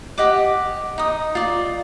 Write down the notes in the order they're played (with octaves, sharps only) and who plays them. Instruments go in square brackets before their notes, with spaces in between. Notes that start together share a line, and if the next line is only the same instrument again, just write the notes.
[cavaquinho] G4 D#5 F#5 D6
D#4 D#6
F4 D5